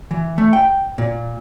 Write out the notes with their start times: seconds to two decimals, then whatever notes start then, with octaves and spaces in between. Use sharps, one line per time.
0.11 E3
0.38 A3
0.53 G5
0.98 A#2